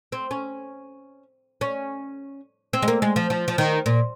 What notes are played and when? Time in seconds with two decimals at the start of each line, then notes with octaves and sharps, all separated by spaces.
0.12 C4
0.31 C#4
1.61 C#4
2.73 C4
2.82 G#3
2.88 A#3
3.02 G#3
3.16 F3
3.30 F3
3.48 F3
3.58 D#3
3.86 A#2